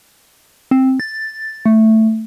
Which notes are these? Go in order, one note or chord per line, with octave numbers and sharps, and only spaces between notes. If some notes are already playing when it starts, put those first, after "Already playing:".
C4
A6
A3